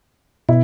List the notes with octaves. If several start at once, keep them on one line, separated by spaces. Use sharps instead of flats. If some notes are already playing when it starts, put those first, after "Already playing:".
B2 E4